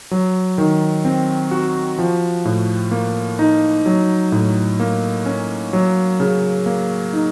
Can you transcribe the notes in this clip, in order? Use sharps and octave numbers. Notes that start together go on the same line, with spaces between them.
F#3
D#3
C4
F#4
F3
A2
A#3
D#4
F#3
A2
A#3
C#4
F#3
C#3
A#3
D#4